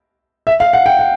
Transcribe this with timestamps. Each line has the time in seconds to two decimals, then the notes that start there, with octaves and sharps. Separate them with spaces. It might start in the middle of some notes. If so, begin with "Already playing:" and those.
0.47 E5
0.60 F5
0.73 F#5
0.86 G5
0.99 F#5